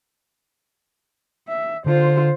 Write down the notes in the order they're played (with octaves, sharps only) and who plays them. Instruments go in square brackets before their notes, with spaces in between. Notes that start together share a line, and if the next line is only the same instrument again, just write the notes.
[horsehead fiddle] E5
[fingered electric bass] D3 [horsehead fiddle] F4 C5